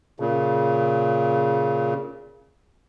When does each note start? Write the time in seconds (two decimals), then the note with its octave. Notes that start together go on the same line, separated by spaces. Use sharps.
0.20 A#2 C#3